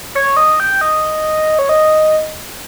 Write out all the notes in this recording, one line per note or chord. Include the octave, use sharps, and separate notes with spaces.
C#5
D#5
G5
D#5
C#5
D#5